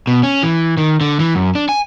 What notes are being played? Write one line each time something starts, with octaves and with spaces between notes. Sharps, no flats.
B2
C#4
E3
D#3
D3
E3
F#2
D4
G#5